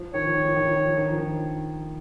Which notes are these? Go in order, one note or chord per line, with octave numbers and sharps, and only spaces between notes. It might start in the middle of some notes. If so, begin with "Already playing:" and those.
Already playing: F3
D#3 C#5
F3
D#3
F3
D#3
F3
D#3
F3
D#3
F3
D#3